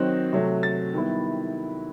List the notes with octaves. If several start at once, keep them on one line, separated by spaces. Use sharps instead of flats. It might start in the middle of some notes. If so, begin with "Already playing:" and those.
Already playing: D#3 F#3 C4 D#4 F#6
C3 F#3 A3
A6
D#3 G3 B3 E4